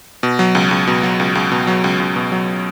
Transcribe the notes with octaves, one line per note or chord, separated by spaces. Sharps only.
B2
F#3
C#2
C#2
B2
F#3
C#2
C#2
B2
F#3
C#2
C#2
B2
F#3